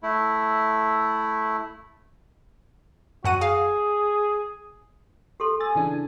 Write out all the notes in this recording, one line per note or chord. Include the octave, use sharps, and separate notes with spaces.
A3 E4
F#2 F#4 F#5 D#7
G#4 F5
G4 A4 C6
G#5 E6 A6
C#3 E3 D4